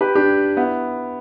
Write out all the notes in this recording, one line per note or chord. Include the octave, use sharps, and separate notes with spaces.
G4 B4
D4 G4
B3 E4